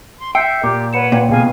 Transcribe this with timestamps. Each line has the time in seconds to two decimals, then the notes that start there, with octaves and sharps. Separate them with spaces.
0.18 C6
0.35 E5 G5 E6 G6 C7 C#7
0.64 A#2 G4 D6
0.93 B4 C#5 F#5 B5 C#7 E7
1.12 A#2 G5
1.29 C#2 B2 G#4 F5 G#5